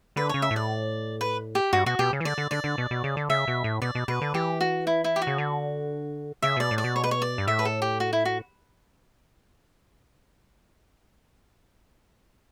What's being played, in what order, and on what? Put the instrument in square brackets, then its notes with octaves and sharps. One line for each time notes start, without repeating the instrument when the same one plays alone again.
[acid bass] D3 [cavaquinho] B4
[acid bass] C#3 [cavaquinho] C#5
[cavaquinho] E5
[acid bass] A2
[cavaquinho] D5
B4
G4
[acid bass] G2 [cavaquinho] F#4
[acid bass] B2 [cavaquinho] F#4
[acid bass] B2 [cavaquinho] G4
[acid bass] C#3
E3
[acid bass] D3 [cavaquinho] D5
[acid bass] D3
[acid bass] D3 [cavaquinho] D5
[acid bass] D3
B2
B2
C#3
D3
[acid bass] C#3 [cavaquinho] E5
[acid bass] B2
A2
[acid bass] B2 [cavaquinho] D5
[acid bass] B2
[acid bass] B2 [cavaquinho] B4
[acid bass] D3
[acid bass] E3 [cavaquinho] G4
[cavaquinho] F#4
E4
E4
G4
F#4
[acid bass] C#3
D3
[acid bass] C#3 [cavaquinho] E5
[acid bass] B2 [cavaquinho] D5
[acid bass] A2
[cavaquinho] D5
[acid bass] B2
[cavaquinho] C#5
B4
C#5
D5
[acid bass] G2
[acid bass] A2 [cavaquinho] E5
[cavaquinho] B4
A4
G4
F#4
E4
F#4